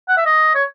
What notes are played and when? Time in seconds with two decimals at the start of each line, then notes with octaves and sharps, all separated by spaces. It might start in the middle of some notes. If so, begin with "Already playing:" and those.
0.09 F#5
0.17 E5
0.25 D#5
0.55 C#5